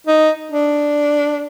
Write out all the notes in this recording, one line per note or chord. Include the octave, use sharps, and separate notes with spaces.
D#4
D4